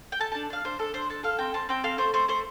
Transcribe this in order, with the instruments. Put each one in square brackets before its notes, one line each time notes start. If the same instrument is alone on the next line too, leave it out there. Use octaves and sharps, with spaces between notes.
[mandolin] G5
A4 A5
D4 A5
D4 F5
D4 C5
D4 A4
D4 C5
A4 A5
A4 F5
C4 G5
C4 A5
C4 G5
A4 F5
A3 C5
A3 C5
A3 C5